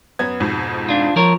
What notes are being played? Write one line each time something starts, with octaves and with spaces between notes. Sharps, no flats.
F#2 B3 G#6
F2 G#2 B2
D4 F4
F3 A#4 C#5